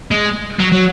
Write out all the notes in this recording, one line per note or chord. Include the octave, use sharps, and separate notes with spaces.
G#3
F#3
F#3